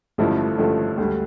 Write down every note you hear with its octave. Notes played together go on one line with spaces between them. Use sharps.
A1 G2 D3 F3 A3 E4
A1 G2 D3 F3 A3
D2 D3 G3